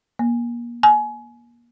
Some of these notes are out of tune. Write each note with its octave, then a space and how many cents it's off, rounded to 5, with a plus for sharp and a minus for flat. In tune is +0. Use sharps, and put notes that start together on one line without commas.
A#3 +30
G#5 +25